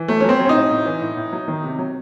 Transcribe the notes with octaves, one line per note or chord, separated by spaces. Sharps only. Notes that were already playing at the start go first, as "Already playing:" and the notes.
Already playing: E3
F#3 A3
C#4
F#3 C4
F#3
C#4
D#4
A2
A2
E3
A2
A2
F#3
D#3
C3
F#3